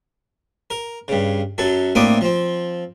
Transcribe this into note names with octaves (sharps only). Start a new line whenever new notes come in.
A#4
G2 C#3
F#2 F#3 A4
A2 A#3 C4 D4 D6 D#6
F3 C4